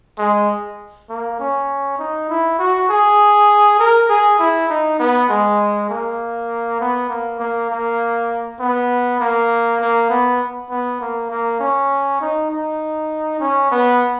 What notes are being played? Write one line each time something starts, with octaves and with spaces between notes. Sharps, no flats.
G#3
A#3
C#4
D#4
E4
F#4
G#4
A#4
G#4
E4
D#4
B3
G#3
A#3
B3
A#3
A#3
A#3
B3
A#3
A#3
B3
B3
A#3
A#3
C#4
D#4
D#4
C#4
B3